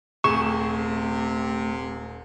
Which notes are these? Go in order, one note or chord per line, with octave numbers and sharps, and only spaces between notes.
D#1 C3 A3 G#4 C#6 E7